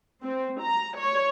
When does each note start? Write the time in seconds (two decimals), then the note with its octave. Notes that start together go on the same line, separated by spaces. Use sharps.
0.24 C4
0.61 A#5
0.98 C#5